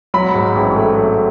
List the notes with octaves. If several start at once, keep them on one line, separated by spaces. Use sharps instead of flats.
F#3 B5
G#2
A1
A3
F#3